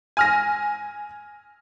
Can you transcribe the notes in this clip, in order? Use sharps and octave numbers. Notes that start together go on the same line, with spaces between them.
G#5 F6 A#6